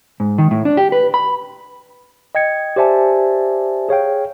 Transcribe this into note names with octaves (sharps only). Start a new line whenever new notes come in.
G#2
D#3
A2
D4
G4
B4
B5
D#5 G5 G#6 C#7
G4 C5 D5 E5 G#5 A5
G#4 C#5 F5 G5